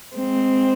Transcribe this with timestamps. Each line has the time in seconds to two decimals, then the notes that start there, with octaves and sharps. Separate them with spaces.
0.16 G#3 C4